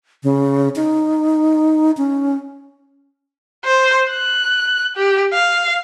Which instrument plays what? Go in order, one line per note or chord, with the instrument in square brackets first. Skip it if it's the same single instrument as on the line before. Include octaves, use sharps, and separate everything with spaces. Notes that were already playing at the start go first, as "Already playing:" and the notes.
[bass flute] C#3
D#4
C#4
[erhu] C5
F#6
G4
F5